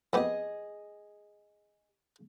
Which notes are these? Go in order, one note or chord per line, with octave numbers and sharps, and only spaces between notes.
F2 B3 G4 G#4 D#5